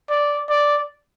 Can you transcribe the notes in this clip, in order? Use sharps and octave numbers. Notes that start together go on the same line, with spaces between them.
D5
D5